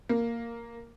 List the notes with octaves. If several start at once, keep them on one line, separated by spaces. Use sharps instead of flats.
A#3